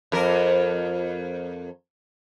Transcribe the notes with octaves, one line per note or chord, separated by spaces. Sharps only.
F2 A#4